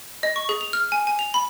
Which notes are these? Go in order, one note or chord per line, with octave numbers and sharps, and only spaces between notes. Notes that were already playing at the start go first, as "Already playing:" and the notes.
D#5
C#6
G#4
F7
F6
G#5
G#5
F7
B5